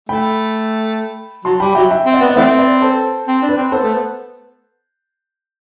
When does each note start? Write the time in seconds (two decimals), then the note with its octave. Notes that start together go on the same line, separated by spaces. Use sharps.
0.09 A3 G5 B5
1.45 F#3 A5 C6
1.60 G3 G5 B5
1.75 F#3 E5 G5
1.91 E5 G5
2.06 C4
2.13 D5 F#5
2.21 B3
2.30 D5
2.35 E3 A3 C4 C5 E5
2.59 B4 D5
2.82 A4 C5
3.27 C4
3.42 D4
3.49 B4
3.57 C4
3.72 B3 A4 C5
3.83 A3
3.94 B3